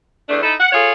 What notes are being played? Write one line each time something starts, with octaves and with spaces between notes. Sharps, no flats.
E2 A3 D4
D#4 E4 A4
F#5
F4 G#4 A4 C#5